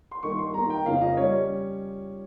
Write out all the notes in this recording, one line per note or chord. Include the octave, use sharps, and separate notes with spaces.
C6
G2 D#3 A#3 D#4 C#6
C6
D#3 A#3 D#4 A#5
G5
F2 C#3 F3 A#3 C#4 F5
D#5
G3 C#4 C#5